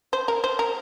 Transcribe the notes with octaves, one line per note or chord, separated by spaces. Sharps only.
C5
A#4
C5
A#4